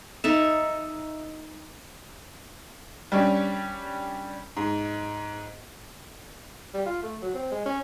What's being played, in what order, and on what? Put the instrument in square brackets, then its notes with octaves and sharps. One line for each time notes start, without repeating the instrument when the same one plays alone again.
[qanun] D#4 A4 E5
[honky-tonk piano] G3 C#4 D4
G#2
[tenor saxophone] G3
F4
A3
F#3
C4
G#3
C#4